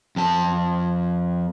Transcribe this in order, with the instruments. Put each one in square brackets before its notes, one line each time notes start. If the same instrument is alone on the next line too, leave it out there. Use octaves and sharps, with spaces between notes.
[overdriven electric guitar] F2 A5